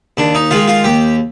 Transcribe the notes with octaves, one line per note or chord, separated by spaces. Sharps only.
D#2 D4
D#4
D#3 G#3 F4
F4
D#2 G4